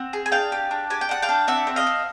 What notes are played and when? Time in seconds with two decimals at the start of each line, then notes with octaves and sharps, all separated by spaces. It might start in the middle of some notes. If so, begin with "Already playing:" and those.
Already playing: C4 F#5
0.13 G#4
0.26 G#5
0.32 D4 F5 G5
0.52 G4
0.71 D4
0.90 G4 G#5
1.01 G5
1.09 D4 F#5
1.22 F5 G5
1.29 D4
1.48 C4 E5 F#5
1.67 C4
1.76 D#5 F5
1.87 C4